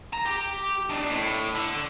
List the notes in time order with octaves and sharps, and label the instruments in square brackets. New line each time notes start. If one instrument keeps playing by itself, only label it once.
[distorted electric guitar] A#5
G4
D4 D#4
A2
D3